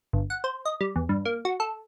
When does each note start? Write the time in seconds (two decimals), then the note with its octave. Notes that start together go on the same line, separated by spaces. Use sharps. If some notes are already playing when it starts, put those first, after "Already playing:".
0.13 G1
0.30 F#5
0.44 C5
0.65 D#5
0.81 G3
0.96 E2
1.09 G2
1.25 A#3
1.45 F#4
1.60 A4